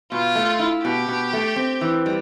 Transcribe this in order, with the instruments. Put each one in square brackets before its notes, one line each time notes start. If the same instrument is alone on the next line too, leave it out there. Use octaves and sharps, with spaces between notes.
[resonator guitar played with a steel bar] B2 [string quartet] F4
[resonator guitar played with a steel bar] A3
E4
[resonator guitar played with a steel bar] B2 [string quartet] G4
[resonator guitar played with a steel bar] B2
A3
C4
E3
G3